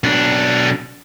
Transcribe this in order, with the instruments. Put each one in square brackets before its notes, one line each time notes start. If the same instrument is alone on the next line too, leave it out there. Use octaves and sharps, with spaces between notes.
[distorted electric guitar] B1 D4